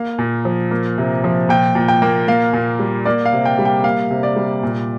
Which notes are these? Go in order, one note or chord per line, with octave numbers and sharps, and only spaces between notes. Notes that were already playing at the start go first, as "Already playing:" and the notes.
Already playing: A#3 F5
A#2
F3
A#3
C3
F3
A#2 G5
A#2
G5
A#3
A#3 F5
A#2
G3
A#3 D5
F5
C3
G5
G3
G5
A#3 F5
C3
D5
G3
A#2